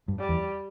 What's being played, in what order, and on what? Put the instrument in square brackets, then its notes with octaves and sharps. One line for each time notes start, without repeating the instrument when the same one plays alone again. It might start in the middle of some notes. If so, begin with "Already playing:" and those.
[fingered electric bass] G2
[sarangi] G3
[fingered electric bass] E2